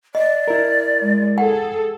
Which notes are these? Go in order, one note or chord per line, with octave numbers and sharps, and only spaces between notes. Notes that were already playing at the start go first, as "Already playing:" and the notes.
D5 D#5
E4 A#4
G#3
G#4 A4 F#5 G5